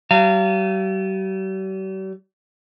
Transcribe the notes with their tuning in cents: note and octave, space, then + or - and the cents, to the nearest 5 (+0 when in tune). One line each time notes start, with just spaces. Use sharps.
G3 -45 F5 -30 A#5 -40